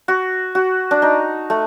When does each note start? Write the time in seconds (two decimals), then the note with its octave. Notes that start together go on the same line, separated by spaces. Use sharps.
0.08 F#4
0.55 F#4
0.91 D4
1.02 D#4
1.50 A3